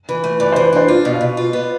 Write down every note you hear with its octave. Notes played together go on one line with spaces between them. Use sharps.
E3
A3
E3 D5
E3 C5
B4
D4 C5
F4 D5
B2
F5
B2
F4
B3